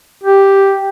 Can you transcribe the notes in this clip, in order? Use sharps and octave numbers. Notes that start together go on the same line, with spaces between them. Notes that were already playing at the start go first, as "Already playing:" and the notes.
G4